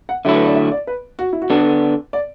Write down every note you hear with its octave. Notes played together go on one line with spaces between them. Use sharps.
F#5
D3 F#3 A3 E4 E5
B4
D5
E5
D5
B4
F#4
E4
F#4
D3 B3 D4 A4
D5